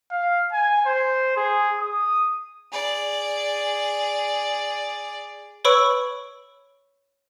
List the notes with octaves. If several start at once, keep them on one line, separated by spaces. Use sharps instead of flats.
F5
G#5
C5
G#4
D#6
G#4 D5
B4 C#5 B5 C#6 E6 D7